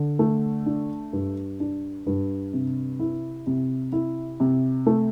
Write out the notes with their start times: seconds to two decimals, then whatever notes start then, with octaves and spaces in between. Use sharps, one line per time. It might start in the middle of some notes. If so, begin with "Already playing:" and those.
Already playing: D3
0.19 A3
0.66 D4
1.13 G2
1.60 D4
2.06 G2
2.53 C3
3.00 E4
3.47 C3
3.92 E4
4.40 C3
4.86 A3